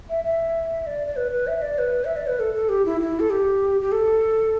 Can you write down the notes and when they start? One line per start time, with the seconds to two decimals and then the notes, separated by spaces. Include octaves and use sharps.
0.10 E5
0.24 E5
0.87 D5
1.07 D5
1.16 B4
1.31 B4
1.47 E5
1.62 D5
1.78 B4
2.05 E5
2.16 D5
2.27 B4
2.40 A4
2.54 A4
2.69 G4
2.86 E4
3.01 E4
3.20 A4
3.30 G4
3.81 G4
3.92 A4